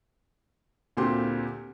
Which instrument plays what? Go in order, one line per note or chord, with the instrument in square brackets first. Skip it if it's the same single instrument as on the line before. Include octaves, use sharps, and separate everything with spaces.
[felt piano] D2 A#2 C4 G4 C6